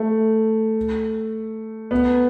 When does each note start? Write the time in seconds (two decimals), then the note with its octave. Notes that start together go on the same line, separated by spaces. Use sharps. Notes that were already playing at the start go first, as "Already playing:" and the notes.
Already playing: A3
1.91 B3